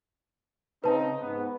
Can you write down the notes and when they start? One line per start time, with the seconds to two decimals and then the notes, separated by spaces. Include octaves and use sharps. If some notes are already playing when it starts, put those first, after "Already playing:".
0.84 C#3 C4 D#4 B4 A5
1.21 G#2 B3